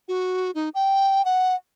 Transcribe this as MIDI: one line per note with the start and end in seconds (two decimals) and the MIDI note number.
0.08 0.51 66
0.55 0.69 63
0.74 1.24 79
1.25 1.55 78